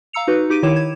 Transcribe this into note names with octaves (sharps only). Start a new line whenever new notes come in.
F5 A#5 E6 C#7 F7
D#4 F#4 B4
D#4 G4 D6 D7 D#7
D#3 E4 C#5 D6 E7
G#6